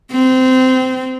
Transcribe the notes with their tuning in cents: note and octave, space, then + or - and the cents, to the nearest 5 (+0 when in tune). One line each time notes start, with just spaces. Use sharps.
C4 -20